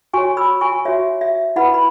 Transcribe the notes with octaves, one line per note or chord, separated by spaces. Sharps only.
F#4 C#5 G#5 C#6
B5 E6
G#5 C#6
F#4 C#5 E5
E5
E4 B4 F#5 B5
B5